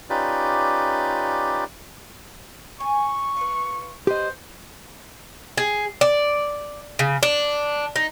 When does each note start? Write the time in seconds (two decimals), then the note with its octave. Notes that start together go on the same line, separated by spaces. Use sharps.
0.10 C#4 D#4 F4 G4 B4 D5
2.80 G#5 C#6
3.37 F4 B4
4.07 G4 B4 C5 D#5
5.57 G#4
6.01 D5
6.99 C#3
7.23 D4
7.96 D#4